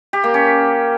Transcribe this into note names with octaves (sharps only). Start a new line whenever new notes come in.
G4
A#3
C#4